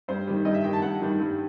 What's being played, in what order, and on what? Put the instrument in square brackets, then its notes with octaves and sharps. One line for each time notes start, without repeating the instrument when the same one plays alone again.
[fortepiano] G2 C5
D#3 G3
G2 D#5
E5
D#3 G3 G5
A5
G2 F#5
D#3 G3
G2